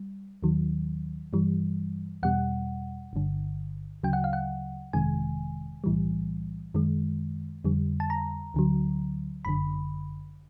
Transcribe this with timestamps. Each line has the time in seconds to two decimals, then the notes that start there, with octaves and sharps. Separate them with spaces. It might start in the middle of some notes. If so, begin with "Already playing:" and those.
Already playing: G3
0.43 D#2 D#3 F#3
1.33 G2 E3 G3
2.23 E2 B2 G3 F#5
3.13 G1 G2 D3
4.03 D2 C#3 F#3 G5
4.13 F#5
4.24 F5
4.33 F#5
4.93 G1 F2 C3 D#3 G#3 G#5
5.84 B1 A2 E3 G3
6.74 F#2 D#3 G#3
7.64 F2 D3 G3
8.00 A5
8.10 A#5
8.54 D2 D3 F#3
9.45 G1 F#2 D3 B5